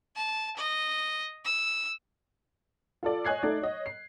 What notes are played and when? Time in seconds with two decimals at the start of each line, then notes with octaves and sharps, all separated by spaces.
0.16 A5
0.57 D#5
1.45 E6
3.03 F4 A4 D5
3.25 C#5 D#5 G#5 F#6 G#6 C7
3.43 A3 D#4 A4 D5
3.62 C#5 D#5
3.86 C7